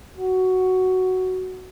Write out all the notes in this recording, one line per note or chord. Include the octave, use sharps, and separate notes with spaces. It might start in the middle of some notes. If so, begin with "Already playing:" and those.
F#4